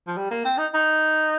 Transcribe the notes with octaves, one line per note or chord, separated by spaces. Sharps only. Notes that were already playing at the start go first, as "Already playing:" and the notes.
F3
G3
A#3
C4
D#4
D#4